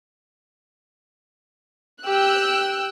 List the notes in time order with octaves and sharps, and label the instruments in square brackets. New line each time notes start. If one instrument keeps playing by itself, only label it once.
[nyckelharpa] G4 [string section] G5 E6 F#6